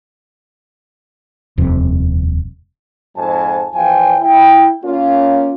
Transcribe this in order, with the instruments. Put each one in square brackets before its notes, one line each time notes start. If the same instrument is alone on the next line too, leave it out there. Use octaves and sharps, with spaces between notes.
[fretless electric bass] D#1 F2 C3
[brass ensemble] F2 G#2 C5 G#5 A5
E2 F3 C5 F5 G5 G#5
E4 G5
A#3 C#4 F4